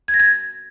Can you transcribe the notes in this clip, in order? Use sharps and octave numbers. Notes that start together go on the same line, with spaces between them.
G#6
A#6
G#6